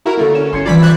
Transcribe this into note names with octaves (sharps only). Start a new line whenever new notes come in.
E4 F#4 A#4 A#5
D3 A3 A#3
C#4 E7
G1 C#4 C6 G#6 C#7
E3 G3 F4 D5 B5 B6
C5 D5 E6 F#6 G#6